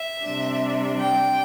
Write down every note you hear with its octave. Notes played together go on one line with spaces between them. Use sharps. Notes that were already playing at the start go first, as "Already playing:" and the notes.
Already playing: E5
C3 G3 D4
G5